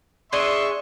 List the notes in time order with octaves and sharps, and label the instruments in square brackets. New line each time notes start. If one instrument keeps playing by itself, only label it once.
[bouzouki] D4 G#4 D#5 [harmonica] E5 C6 C#6